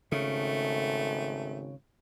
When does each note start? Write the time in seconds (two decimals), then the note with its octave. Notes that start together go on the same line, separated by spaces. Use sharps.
0.12 G#1 C#3 A3